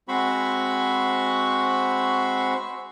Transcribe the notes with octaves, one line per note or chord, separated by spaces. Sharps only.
G#3 C4 F#4 C5 B5 C#6